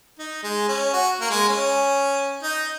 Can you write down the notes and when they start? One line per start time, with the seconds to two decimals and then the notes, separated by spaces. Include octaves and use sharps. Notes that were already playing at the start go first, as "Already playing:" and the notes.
0.19 D#4
0.43 G#3
0.69 C#4
0.93 F#4
1.21 A#3
1.30 G#3
1.49 C#4
2.42 D#4